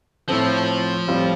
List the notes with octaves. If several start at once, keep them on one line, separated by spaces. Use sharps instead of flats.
A2 F3 A3 C4 A4 C5
A2 G3 C4 F4